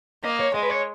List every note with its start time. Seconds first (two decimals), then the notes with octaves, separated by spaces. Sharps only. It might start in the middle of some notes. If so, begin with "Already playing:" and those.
0.24 A#3 D#5
0.40 C#5
0.54 G#3 D#5
0.63 B4
0.69 C#5